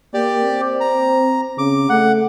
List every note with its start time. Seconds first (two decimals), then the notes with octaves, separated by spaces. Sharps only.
0.14 A#3 G4 D5
0.43 C4
0.80 A#5
1.58 C#3 D6
1.89 A3 F#5